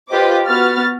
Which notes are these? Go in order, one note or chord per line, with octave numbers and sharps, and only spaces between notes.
F4 G4 B4 C5 D#5 D6
B3 F#4 F6 A6